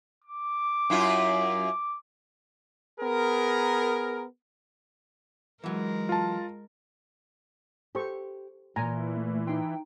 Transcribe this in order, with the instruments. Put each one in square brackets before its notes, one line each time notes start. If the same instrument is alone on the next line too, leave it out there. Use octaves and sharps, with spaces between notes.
[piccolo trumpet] D6
[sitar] F#2 E4 F4
[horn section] B3 G#4 A#4
[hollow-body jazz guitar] E3 F#3 [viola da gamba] G#3 A#4
[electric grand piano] F4 A5
[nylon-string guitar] G4 [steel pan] A4 C5 C#6
[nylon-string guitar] A#2 [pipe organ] E3 [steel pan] G#5 A#5
[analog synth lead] A3
[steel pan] D#4 C6 [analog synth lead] G5